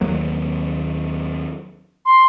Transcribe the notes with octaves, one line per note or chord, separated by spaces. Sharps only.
D#2 F#3 A#3
C6